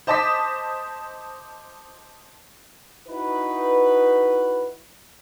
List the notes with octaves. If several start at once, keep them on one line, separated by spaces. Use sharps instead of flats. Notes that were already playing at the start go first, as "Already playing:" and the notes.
C5 D#5 A5 D6 D#6 B6
D#4 E4 F#4 B4